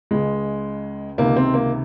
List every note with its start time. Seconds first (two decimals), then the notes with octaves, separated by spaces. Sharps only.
0.11 C#2 C#3 G#3
1.18 C#2 C3 D#3 A#3
1.37 C4
1.54 A#3